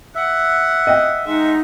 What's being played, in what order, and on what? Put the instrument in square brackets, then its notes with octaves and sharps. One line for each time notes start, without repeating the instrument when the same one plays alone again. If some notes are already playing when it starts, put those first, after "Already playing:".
[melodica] E5 [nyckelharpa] F#5
[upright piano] D#5 G5
[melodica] G#3 [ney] D#4 [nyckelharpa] E5 F#5